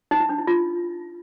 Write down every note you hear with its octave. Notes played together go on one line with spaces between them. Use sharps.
D#4
E4
D4
E4
F4